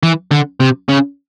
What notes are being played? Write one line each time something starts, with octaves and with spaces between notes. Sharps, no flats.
E3
D3
C3
C#3